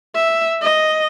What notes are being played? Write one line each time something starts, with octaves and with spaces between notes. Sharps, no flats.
E5
D#5